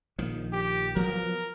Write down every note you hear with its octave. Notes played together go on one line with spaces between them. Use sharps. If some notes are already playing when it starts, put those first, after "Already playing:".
A#1 D#3 F3
G4
F3 F#3 B3 A#4